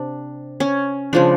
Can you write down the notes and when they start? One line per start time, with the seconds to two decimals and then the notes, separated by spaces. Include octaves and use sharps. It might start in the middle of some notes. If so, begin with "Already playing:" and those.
Already playing: C3 D4
0.60 C#4
1.13 C#3 F3 G#3 D4